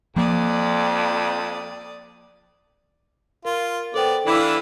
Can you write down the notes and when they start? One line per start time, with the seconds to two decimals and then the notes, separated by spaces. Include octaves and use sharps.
0.16 F2 F3 A#3 D5 D#6
3.45 F4 A#4
3.94 B3 A4 C5 D5 G5
4.26 E3 D4 E4 A4 B4 F5 D6